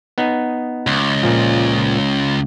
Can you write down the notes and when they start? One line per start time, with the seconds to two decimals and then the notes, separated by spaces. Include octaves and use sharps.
0.18 B3 D#4
0.87 C#2
1.23 A#2 F3